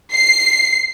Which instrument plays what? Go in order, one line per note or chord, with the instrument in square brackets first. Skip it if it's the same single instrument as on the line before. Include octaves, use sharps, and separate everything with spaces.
[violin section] C7